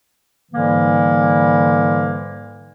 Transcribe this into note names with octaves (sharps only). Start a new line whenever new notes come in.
G#2 D3 E3 G3 A#3